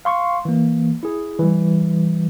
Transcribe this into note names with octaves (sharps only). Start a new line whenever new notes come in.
F5 C6 C#6
E3 A#3
E4 G#4
E3 G3